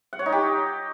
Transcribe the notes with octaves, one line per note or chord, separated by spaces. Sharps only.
F#5
C#5
D#4
G4